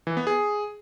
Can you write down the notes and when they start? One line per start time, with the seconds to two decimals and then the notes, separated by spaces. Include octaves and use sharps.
0.07 E3
0.17 B3
0.27 G#4